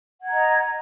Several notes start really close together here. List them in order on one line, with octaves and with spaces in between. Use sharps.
F#5 G#6 A#5 D#5